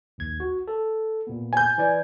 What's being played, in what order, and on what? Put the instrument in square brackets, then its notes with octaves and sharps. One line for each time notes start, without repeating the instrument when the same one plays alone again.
[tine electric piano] A#1 D#2 G#6
F#4
A4
A#2 B3
[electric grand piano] G#5 G6
[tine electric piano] E3 D5 G#6